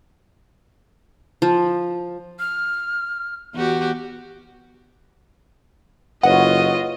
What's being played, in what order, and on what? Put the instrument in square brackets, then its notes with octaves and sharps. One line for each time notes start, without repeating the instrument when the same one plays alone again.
[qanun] F3
[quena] F6
[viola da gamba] E2 F#4 G4
[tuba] F#1 [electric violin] F4 D#5 [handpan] B4 C#5 [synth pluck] F#5